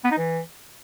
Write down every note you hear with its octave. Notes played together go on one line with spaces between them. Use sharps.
B3
D#4
E3